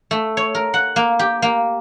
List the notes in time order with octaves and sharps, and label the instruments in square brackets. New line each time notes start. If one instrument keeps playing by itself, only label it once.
[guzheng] A3
C#5
A#4
F#5
A#3
G4
A#3